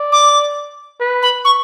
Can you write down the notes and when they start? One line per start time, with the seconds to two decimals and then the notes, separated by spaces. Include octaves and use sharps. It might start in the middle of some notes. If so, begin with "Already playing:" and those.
Already playing: D5
0.12 D6
1.00 B4
1.22 B5
1.45 C#6